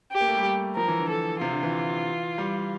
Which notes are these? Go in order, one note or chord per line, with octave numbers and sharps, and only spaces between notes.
G4
A#3
A3
G3
F3 A#4
E3
D3
A4
C3 F4
D3
E3
G3